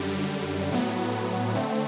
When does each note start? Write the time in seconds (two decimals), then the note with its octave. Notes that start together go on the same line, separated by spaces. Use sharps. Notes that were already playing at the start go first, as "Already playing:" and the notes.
Already playing: F#2 D3 G3
0.72 A2 F#3 B3
1.55 D3 A3 C4